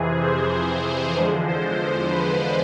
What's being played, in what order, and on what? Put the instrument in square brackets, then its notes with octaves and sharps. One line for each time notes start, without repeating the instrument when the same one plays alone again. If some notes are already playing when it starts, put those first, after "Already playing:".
Already playing: [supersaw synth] F2 C3 E3 G#4
C5
E2 D3 F3 G#3
C5
B4